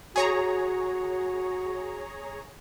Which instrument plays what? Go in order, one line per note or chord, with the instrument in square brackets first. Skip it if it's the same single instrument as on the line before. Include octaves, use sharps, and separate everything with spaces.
[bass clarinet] F#4 [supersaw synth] G#4 C#5 A#5